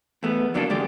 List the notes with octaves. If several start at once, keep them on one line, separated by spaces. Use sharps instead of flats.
E2 A3 B3
E2 D3 F#3 A#3 D4 A4
F#2 D3 G#3 G4 D5